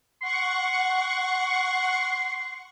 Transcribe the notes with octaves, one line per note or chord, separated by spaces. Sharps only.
F#5 C6 C#6